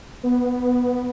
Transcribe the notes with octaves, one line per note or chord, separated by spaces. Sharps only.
B3